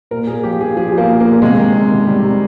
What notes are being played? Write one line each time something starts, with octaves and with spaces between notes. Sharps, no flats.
A#2 A#4
A#2 G#4
F3 G4
F3 G#4
F3 G#4
F3
A#3
A#2
A#3
A#2
C3 G#3
D#3
D#3
D#3
D#3 G3
C3